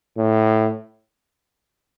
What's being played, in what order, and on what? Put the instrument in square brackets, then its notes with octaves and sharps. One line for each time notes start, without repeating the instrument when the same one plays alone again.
[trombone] A2